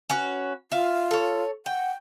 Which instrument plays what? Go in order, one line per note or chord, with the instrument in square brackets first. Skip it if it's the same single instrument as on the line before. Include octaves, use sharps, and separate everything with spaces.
[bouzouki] C#4 F#4 B4
[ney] F4 [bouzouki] E5 F5
[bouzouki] A4 C#5
[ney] F#5 [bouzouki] G5